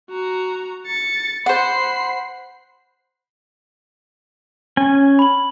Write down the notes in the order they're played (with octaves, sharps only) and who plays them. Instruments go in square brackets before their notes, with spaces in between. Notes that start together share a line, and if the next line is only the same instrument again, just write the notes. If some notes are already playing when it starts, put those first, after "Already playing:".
[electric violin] F#4 A#5
A6 C#7
[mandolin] C5 F#5 [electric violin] B5 C7
[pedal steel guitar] C#4 G#5
[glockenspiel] B5 F#7